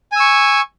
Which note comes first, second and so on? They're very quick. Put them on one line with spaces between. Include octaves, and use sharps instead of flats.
G#5 E6 C#6